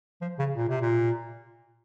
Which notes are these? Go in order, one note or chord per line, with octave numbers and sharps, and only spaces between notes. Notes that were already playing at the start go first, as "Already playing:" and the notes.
F3
C#3
A#2
C3
A#2